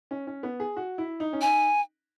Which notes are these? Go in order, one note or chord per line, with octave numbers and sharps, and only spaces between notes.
C#4
C#4
B3
G#4
F#4
E4
D#4
C#4
D#4 G#5